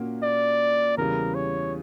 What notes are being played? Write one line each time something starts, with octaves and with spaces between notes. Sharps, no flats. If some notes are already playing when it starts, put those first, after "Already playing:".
Already playing: A#2 A#3 C#4 F#4
D5
E2 C#3 G3 A#4
C#5